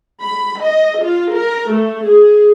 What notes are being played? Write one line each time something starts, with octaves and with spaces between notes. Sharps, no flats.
B5
D#5
F4
A#4
A3
G#4